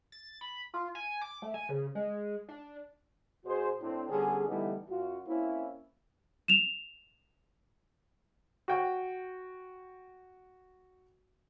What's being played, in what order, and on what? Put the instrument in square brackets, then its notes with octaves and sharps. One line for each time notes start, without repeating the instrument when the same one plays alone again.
[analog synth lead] A6
B5
F4
G#5
D6
A3
G#5
C#3
G#3
D4
[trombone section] B2 F#4 G#4 C5
A2 C4 D4
D3 G3 B3 C#4 G#4
D3 E3 G3 A3 B3 D#4
F#2 F4 F#4
A#3 C4 C#4 E4
[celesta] E7 F7
[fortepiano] F#4 G5